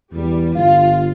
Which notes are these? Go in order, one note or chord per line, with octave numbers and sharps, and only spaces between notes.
E2 G3
G1 F4 F5